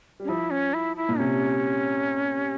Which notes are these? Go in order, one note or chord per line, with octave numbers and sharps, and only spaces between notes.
G3
C#4
F3 E4
C#4
E4
E4
A#2
C3 C#4